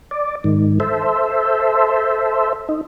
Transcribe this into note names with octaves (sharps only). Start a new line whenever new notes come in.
D5
G#2 D#3
A4 C5 E5
D#4